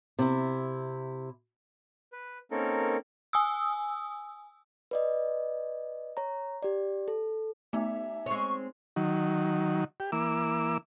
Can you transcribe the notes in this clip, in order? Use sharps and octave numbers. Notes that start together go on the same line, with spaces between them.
C3 E4
B4
A#3 C4 C#4 D#4 A4 A#4
G#5 D#6 E6
B4 D5 D#5
C#5 A#5
G4 D5
A4
A3 B3 D#4 E5
G#3 C4 C#5 C#6
D#3 F#3
G4
E3 A#3 D6 E6